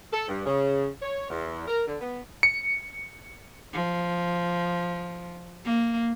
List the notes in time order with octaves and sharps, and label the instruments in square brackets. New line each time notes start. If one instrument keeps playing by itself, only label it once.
[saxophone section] A4
G2
C#3
C#5
E2
A#4
D3
B3
[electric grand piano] C#7
[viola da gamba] F3
A#3